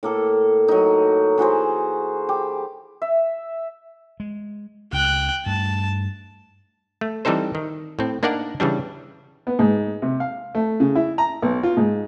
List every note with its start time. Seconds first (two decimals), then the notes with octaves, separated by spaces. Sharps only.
0.03 A2 A#3 A4
0.68 F#3 D#4
1.38 E3 F#4 G#4 C5
2.29 G4
3.02 E5
4.20 G#3
4.93 C#2 G5 F#6
5.46 G2 A3 A5
7.01 A3
7.25 E3 G3 C4 D#4 A4 C5
7.55 D#3
7.99 A2 C4
8.23 A#3 D4 D#4 A#4 D5 F#5
8.60 C#3 E3 G3 D4
9.47 B3
9.59 G#2
10.02 C3
10.20 F5
10.55 A3
10.80 C#3
10.95 E4
11.18 A#5
11.42 B1
11.63 F4
11.77 G#2